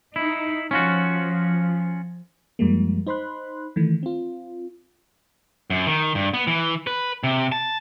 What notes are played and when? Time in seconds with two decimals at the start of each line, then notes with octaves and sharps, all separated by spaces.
0.16 D#4 E4
0.71 F3 C#4 F4 F#4
2.59 F#2 F3 G3 G#3 A#3
3.07 D#4 C5 B5 C6 F#6
3.76 D#3 E3 A3
4.03 C4 F4
5.70 F#2
5.87 D#3
6.15 G2
6.34 B3
6.47 E3
6.87 B4
7.24 C3
7.52 A5